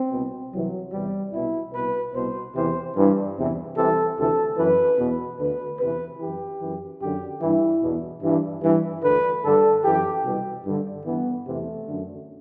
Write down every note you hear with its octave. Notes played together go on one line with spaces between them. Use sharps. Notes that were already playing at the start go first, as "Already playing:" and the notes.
Already playing: C4
C2 B2
C2 C3 E3 F#3
E2 C3 E3 G3
C2 B2 E4
C2 B2 B4
C2 B2 C5
E2 C3 E3 C5
G2 E3
E2 C3 E3
C2 C3 E3 A4
D2 C3 E3 A4
F#2 E3 B4
E2 B2
D2 D3 B4
E2 C3 E3 B4
F#2 E3 G4
F#2 E3
F#2 D3 G4
G2 E3 E4
E2 B2
G2 E3
G2 E3
D2 D3 B4
G2 D3 A4
F#2 E3 G4
C2 B2
G2 D3
G2 E3 B3
E2 C3 E3 A3
F#2 D3